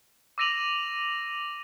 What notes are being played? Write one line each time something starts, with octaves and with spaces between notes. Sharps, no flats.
D6 E6 A#6 D#7 F7 F#7